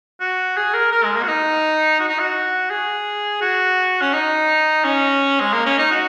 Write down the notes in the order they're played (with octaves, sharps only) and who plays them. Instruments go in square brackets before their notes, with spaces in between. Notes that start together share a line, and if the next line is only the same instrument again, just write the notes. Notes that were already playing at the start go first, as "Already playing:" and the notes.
[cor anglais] F#4
G#4
A#4
A#4
G#3
A#3
F#4
D#4
F#4
D#4
F#4
G#4
F#4
C#4
D#4
C#4
G#3
A#3
C#4
D#4
F#4